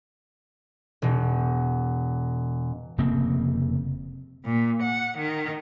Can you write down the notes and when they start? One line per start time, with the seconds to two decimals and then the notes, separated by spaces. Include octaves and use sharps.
1.02 E1 B2
2.98 F1 C#3 A#3 C4
4.45 A#2
4.83 F#5
5.18 D#3